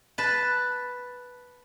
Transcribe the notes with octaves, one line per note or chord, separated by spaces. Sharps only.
B4 A5